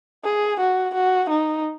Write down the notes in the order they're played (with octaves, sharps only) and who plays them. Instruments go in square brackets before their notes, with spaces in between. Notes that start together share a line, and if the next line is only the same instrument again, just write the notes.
[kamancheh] G#4
F#4
F#4
D#4